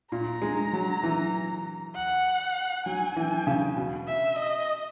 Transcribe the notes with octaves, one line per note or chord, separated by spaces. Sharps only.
A#2 A#5
G#3
F#3
E3
F#5
F#3 G#5
E3
C#3
B2
E5
D#5